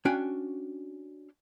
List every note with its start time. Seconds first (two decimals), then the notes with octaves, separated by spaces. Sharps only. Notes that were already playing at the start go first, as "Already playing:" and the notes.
0.05 C#4 D4 F#4 F5 G5 G#5